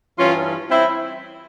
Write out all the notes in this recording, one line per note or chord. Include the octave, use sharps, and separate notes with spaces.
G2 E3 C#4 F4
C4 E4